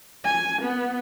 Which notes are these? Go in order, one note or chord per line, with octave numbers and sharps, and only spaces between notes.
G#5
B3